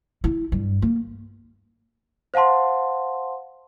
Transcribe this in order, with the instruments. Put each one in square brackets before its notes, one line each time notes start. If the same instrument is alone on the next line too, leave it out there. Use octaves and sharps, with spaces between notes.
[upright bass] E4
G2
A#3
[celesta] C5 F5 F#5 A5 C6